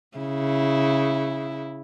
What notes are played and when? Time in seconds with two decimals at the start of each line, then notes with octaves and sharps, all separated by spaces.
0.17 C#3 E4